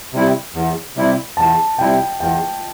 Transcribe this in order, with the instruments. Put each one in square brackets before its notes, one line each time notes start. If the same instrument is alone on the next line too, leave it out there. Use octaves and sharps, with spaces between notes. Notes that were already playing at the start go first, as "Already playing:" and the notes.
[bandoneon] C3 G3 E4
E2
C3 G3 E4
[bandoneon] E2 [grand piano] A5
[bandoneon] C3 G3 E4 [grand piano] G5
[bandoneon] E2 [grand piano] G5